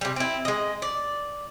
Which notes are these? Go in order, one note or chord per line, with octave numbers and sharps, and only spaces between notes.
C3 G3
C4 E4
G#3 D#5
D5